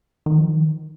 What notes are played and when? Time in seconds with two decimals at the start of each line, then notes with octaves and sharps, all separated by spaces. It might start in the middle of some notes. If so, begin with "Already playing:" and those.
0.26 D#3
0.38 F3
0.49 D#3